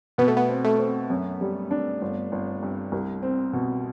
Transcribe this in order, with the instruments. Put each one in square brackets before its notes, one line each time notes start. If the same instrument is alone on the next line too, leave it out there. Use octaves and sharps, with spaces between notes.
[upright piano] B2 [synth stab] B3
[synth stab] A3
B3
[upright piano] C4
[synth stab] A3
[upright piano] C4
F#2
G3
D4
G1
G1
G2
C2
C4
B2